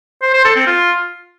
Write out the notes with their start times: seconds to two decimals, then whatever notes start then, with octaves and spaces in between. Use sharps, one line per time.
0.22 C5
0.33 C5
0.45 A4
0.56 C4
0.67 F4